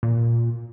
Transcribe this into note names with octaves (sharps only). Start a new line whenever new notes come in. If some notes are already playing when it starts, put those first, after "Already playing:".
A#2